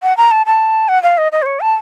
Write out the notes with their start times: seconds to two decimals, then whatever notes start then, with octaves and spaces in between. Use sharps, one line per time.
0.03 F#5
0.17 A#5
0.31 A5
0.46 A5
0.88 F#5
1.03 F5
1.18 D#5
1.32 D#5
1.42 C5
1.46 C#5
1.60 A5